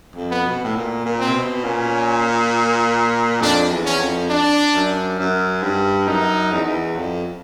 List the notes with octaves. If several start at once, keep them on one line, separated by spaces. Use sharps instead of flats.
F2
B3
B2
A2
A#2
A#2
C4
C3
B2
A#2 C#4
F2 D4
E2
C#4
F2
D4
F#2
F#2
G2
F#2 D#4
E2
E2
F2